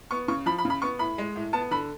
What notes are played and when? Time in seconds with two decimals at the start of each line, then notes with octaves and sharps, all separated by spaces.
0.11 B3 C#6
0.28 C#3 C#6
0.46 F3 B5
0.58 B5
0.65 C#3
0.70 B5
0.82 B3 C#6
0.99 A2 B5
1.18 G#3
1.36 A2
1.53 B3 A5
1.71 D3 B5